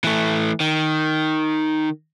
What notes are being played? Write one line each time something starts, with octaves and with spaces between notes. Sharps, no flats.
E3 A3
D#3